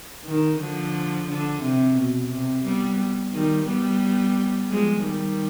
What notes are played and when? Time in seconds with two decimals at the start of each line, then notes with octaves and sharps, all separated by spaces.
0.25 D#3
0.59 D3 F3
1.28 D3
1.62 C3
1.96 B2
2.31 C3
2.64 G3 B3
3.33 D#3 G3
3.67 G3 B3
4.70 F3 G#3
5.04 D#3 G3